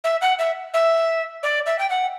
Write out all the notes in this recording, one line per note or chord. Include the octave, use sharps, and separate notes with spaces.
E5
F#5
E5
E5
D5
E5
G5
F#5